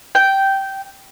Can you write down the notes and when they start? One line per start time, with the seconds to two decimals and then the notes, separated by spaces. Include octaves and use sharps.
0.15 G5